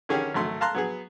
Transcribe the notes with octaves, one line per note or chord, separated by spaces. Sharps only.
D3 D#3 C#4 G4 G#4
G#1 F#3 A3 C6
F5 A5 A#5 C6 F#6
F#3 B3 G#4